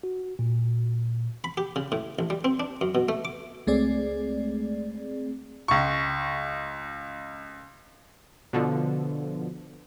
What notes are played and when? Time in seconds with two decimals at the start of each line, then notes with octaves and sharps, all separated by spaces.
0.03 F#4
0.39 A#2
1.44 B5
1.57 G4
1.76 C#3
1.92 A2
2.19 A1
2.30 G3
2.44 C4
2.60 D4
2.81 F#2
2.95 B2
3.09 A3
3.25 D6
3.67 C#2 G#3 A3 C4 G#4 D5
5.68 C#2 C#6
8.53 B2 D3 F3